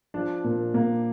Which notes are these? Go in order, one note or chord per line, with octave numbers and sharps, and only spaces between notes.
F3 D4
A#2
A#2 A#3